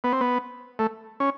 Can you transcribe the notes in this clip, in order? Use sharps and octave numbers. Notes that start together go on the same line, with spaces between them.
B3
C4
B3
A3
C#4